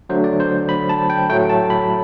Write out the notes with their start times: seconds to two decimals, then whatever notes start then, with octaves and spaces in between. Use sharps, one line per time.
0.09 D3 F#3 A3 C5
0.24 D5
0.40 C5
0.69 B5
0.89 A5
1.10 G5
1.29 A2 F#3 A3 G5
1.50 A5
1.70 B5